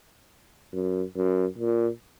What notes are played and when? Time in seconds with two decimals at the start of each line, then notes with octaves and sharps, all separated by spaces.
0.73 F#2
1.16 F#2
1.58 A#2